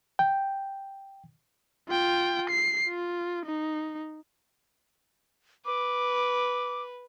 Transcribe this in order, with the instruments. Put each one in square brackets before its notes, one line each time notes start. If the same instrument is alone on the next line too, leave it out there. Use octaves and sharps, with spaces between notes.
[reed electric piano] G5
[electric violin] F4 G5
C7
F4
D#4
[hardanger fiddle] B4 [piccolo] D6